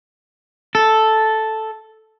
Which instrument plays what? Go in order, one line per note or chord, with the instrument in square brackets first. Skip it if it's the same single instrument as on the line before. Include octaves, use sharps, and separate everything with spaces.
[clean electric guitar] A4